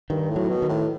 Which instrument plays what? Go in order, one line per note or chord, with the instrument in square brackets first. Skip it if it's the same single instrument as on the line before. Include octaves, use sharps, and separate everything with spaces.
[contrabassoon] G2 [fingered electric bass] D#3
[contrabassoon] A2
[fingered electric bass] F#3
[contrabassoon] B2
[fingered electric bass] D#3
[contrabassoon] A2